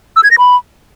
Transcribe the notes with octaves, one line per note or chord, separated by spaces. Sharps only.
E6
G#6
A#6
B5